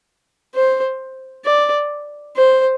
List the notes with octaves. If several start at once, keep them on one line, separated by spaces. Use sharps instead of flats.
C5
D5
C5